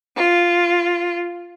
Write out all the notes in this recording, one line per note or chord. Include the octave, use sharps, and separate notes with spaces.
F4